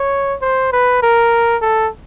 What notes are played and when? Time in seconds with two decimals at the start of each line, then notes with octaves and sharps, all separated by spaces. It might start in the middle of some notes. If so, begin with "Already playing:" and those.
Already playing: C#5
0.42 C5
0.72 B4
1.02 A#4
1.62 A4